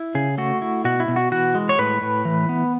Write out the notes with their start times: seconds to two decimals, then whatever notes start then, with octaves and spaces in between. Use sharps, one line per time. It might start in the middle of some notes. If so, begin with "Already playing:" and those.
Already playing: E4
0.15 C#3 G#4
0.38 A3 F#4
0.62 E4
0.84 B2 F#4
1.00 E4
1.08 B2
1.16 F#4
1.32 E3 F#4
1.55 G#3
1.69 C#5
1.79 A2 B4
2.02 A2
2.25 E3
2.49 B3